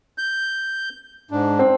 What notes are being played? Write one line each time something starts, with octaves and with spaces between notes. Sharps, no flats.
G6
G#2 D4
C4